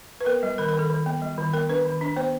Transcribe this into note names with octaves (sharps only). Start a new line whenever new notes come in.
B4
B3 A#4
G3
D#3 A#4
A#4
D#3
A4
D#3
B3
G3
D#3
B3 A#4
D4 B4
D#3
D4
B3 C5